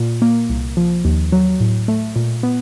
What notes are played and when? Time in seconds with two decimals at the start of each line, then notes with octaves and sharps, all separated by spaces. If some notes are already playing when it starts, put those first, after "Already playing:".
Already playing: A#2
0.22 A#3
0.50 C2
0.77 F3
1.05 D#2
1.32 F#3
1.60 A2
1.88 A3
2.16 A#2
2.43 B3